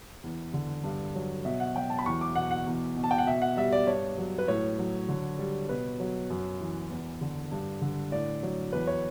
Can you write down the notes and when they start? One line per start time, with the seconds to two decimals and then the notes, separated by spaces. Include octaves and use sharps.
0.23 E2
0.53 D3
0.84 G2
1.15 F#3
1.45 B2 E5
1.60 F#5
1.76 F#3 G5
1.90 A5
1.99 B5
2.06 E2 C#6
2.21 D6
2.35 B2 F#5
2.51 F#5
2.66 E2
2.97 B2
3.04 A5
3.11 G5
3.18 F#5
3.27 B2 E5
3.42 F#5
3.57 G3 E5
3.72 D5
3.87 G2 C#5
4.18 F#3
4.38 B4
4.48 A2 C#5
4.79 F#3
5.08 D3
5.39 G3
5.69 B2 B4
6.00 F#3
6.30 F#2
6.60 E3
6.90 E2
7.21 D3
7.51 G2
7.81 D3
8.12 A2 D5
8.43 F#3
8.73 E2 B4
8.87 C#5